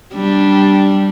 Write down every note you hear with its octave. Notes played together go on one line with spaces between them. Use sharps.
G3 D4